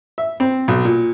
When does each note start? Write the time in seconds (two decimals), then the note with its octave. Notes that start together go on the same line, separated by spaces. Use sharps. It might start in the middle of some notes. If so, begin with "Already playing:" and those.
0.18 E5
0.40 C4
0.68 B1
0.85 A#2